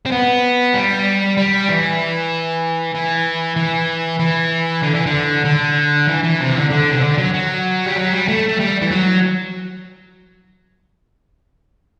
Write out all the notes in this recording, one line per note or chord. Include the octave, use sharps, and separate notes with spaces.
C4
B3
G3
G3
E3
E3
E3
E3
D3
E3
D3
D3
E3
E3
C3
D3
D3
C3
D3
F#3
F#3
G3
F#3
G3
A3
A3
G3
E3
F#3